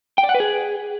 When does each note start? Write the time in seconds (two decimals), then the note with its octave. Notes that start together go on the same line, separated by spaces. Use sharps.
0.18 G5
0.24 D5
0.29 F#5
0.34 B4
0.40 G#4